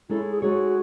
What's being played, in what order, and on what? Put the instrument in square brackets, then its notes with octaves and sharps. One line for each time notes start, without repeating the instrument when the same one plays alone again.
[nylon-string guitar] G#3 D#4 A4 C#5 [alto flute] E4
[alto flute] G#4
[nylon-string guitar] G#3 D#4 A4 C#5 [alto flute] F#4